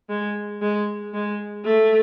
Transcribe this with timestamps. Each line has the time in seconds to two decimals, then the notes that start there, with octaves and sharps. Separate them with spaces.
0.09 G#3
0.62 G#3
1.14 G#3
1.65 A3